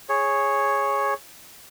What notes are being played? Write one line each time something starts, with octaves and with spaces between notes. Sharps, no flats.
G#4 C#5